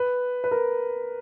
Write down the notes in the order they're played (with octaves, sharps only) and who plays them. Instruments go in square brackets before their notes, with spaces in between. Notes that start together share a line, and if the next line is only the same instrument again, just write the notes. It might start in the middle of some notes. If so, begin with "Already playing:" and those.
Already playing: [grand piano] B4
B4
A#4